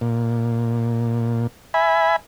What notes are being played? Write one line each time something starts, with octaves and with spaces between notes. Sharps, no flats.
A#2
E5 G#5 B5